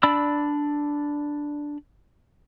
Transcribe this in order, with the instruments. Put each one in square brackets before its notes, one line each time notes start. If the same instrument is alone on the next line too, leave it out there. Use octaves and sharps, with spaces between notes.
[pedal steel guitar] D4 D5 B5 E6